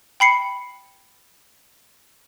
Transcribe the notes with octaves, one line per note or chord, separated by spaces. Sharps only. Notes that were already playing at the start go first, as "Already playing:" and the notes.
G5 B5 C7 C#7